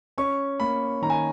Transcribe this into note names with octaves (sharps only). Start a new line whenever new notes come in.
C#4 C#6
A#3 B5
D#3 A#5
G#5